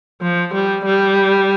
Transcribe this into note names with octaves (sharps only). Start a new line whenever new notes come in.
F3
G3
G3